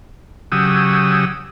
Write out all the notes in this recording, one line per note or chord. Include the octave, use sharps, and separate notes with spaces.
C#3 F#3 G4 D#6 E6